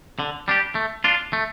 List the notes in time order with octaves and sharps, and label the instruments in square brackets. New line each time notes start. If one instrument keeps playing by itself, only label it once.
[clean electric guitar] D3
G3 D4 G4
A3
D4 F4
A3